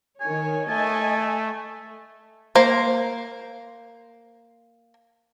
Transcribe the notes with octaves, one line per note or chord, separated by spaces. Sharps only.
D#3 C#5 G#5
A3 D#5 G#5 A5
A#3 C5